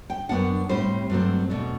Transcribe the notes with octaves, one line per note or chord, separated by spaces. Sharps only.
G5
F#2 E3 B3 D4 F#5
A2 G3 C4 C5
G2 F#3 A3 C4
E2 B2 A3 D4